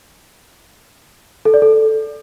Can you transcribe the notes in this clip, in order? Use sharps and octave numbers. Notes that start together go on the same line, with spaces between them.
A4
D5
A4